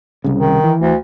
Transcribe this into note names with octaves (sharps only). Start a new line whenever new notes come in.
C2 C#3
D#3
E3
D2